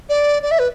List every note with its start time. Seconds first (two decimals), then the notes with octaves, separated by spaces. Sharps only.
0.09 D5
0.42 D5
0.51 E5
0.59 B4